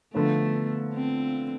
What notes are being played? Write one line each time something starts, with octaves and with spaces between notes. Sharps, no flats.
D3 F3 A3 B3 F4
C4